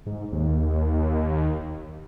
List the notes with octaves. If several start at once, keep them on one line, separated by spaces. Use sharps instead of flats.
G#2
D#2